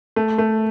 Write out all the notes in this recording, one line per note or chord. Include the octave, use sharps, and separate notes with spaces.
A3
A3